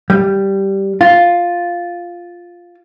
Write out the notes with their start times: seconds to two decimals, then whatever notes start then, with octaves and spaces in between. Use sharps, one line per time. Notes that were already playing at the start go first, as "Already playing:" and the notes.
0.10 G3
1.01 F4